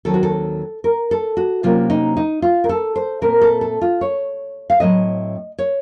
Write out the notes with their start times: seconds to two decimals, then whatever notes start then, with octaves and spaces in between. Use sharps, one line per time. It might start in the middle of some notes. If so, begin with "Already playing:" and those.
0.05 D#2 D#3 F#3 C4 A4
0.14 F#4
0.23 A4
0.84 A#4
1.11 A4
1.37 F#4
1.63 C3 F#3 A#3 C#4 F4
1.90 D#4
2.17 D#4
2.42 F4
2.64 A#4
2.69 A4
2.96 C5
3.22 A#2 A3 C4 A#4
3.41 A4
3.61 A4
3.81 F4
4.01 C#5
4.70 F5
4.80 A2 F#3 A3 C4 D#5
5.59 C#5